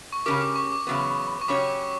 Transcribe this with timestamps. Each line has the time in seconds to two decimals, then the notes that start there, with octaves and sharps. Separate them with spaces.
0.13 C#6
0.26 C#3 F#3 C#4 G4 A#4 D6
0.41 D6
0.56 C#6
0.72 D6
0.87 E2 C#3 F#3 B3
1.41 C#6
1.48 C#3 F#3 C#4 G4 C#5 D6